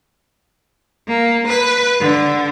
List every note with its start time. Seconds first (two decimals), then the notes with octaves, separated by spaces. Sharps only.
1.08 A#3
1.47 B4
2.00 D3